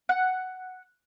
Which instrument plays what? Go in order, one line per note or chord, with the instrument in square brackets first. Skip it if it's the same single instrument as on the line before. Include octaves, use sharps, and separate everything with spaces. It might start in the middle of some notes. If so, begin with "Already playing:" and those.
[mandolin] F#5